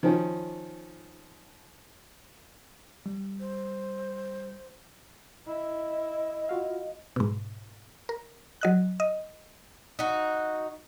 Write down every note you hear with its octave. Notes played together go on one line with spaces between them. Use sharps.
D#3 F3 C#4
G3
C5
E4 D#5
F4 F#4 F5
G#2 B2
A#4
F#3 D#5 F#6
D#5
D#4 F#4